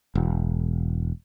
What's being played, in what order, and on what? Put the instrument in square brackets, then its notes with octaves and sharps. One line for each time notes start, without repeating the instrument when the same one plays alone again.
[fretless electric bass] E1